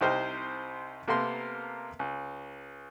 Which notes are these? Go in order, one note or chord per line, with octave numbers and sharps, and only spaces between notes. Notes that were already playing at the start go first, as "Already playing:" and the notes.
C2 C3 D#4 C5 G5 F6
C3 A#3 B3 A4 A#4 C6
C#2